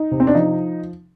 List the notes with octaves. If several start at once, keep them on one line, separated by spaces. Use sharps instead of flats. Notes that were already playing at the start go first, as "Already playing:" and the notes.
Already playing: D#4
C3
C4
D4
F3 D#4